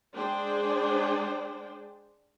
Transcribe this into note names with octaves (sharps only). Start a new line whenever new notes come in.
G#3 D4 G#4 C5 D5 G5